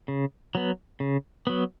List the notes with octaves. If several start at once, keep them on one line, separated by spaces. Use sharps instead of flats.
C#3
F#3 B3
C#3
F#3 B3